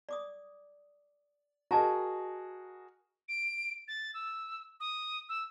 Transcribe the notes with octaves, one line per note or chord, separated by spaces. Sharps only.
D5 D6 D#6
F#4 G#4 A#4 D#5 A5 A#5
D7
A6
E6
D#6
E6